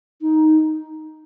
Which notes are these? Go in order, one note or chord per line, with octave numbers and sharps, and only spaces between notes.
D#4